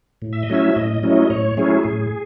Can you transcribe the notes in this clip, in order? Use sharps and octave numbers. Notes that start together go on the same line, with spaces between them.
A2
E5
D#5
F#3 A3 C#4 E4 E5
A2 D#5
F#3 A3 C#4 E4 D#5
A2 C#5
F#3 A3 C#4 E4 G#4
A2 G#4